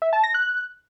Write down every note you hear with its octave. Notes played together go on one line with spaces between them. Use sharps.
E5
A5
A#6
F#6